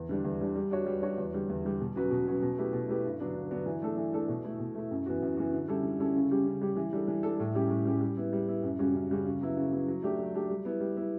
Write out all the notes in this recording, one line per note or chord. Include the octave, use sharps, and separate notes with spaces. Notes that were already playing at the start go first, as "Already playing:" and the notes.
Already playing: E2
D3 G3 D4
E2
D3 G3 D4
G3
D4 F#4 C#5
G3
D4 F#4 C#5
E2
D3 G3
E2
D3 G3
B2
F#3 C#4 F#4 B4
B2
F#3 C#4 F#4 B4
B2
A3 E4 G4 B4
B2
A3 E4 G4 B4
G2
D3 F#3 B3 D4
G2
D3 F#3 B3 D4
E3
A3 D4 A4
E3
A3 D4 A4
B2
A3 E4
B2
A3 E4
F#2
E3 B3 F#4
F#2
E3 B3 F#4
D3
G3 C#4 E4 A4
D3
G3 C#4 E4 A4
C#3
G3 C#4 G4
C#3
G3 C#4 G4
E3
G3 D4 A4
E3
G3 D4 A4
A2
G3 C#4 G4
A2
G3 C#4 G4
G3
B3 E4
G3
B3 E4
F#2
C#3 G3 C#4 F#4
F#2
C#3 G3 C#4 F#4
C#3
F#3 B3 E4
C#3
F#3 B3 E4
F#3
A3 D4 G4
F#3
A3 D4 G4
G3
B3 E4
G3
B3 E4